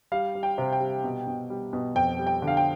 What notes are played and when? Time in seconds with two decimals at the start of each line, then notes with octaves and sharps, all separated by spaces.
0.12 G3 F5
0.35 G3
0.43 G5
0.58 C3
0.73 G5
0.80 G3
1.04 B2
1.27 B2
1.50 G3
1.73 B2
1.95 F2 G5
2.19 G3
2.27 G5
2.42 D3
2.48 F5
2.57 G5